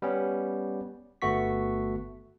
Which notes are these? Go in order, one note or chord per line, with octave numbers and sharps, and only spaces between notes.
G3 B3 C#4
G1 A3 B3 F#4 C#6 B6